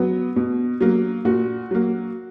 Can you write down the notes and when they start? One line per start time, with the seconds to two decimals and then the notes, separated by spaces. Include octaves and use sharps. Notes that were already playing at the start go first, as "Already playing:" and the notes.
Already playing: F#3 B3
0.36 B2
0.81 F#3 A#3
1.25 A#2 F#4
1.71 F#3 A#3